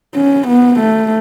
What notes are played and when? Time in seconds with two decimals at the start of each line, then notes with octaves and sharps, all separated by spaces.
0.15 C#4
0.47 B3
0.79 A3